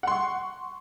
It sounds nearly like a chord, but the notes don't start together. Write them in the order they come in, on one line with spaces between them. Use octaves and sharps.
F#5 C6 C#6